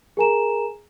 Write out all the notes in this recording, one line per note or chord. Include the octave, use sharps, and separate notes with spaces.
G#4 A#4 G#5 A#5 E7